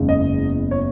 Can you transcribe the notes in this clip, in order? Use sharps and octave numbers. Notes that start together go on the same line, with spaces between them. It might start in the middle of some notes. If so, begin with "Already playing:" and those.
Already playing: F#1 E2 C#3 G#3
D#5
C#5